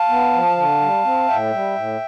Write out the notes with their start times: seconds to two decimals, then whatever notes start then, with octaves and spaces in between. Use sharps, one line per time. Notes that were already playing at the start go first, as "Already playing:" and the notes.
Already playing: F5 A5
0.09 B3
0.33 F3
0.57 D3
0.81 G3
1.04 C4
1.28 A2 E5 G5
1.53 G3
1.76 A2